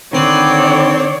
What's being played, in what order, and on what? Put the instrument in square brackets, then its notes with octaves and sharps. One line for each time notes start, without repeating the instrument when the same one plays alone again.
[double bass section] D3 [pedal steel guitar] D#3 B4 [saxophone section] C4 [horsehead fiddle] C#5 D5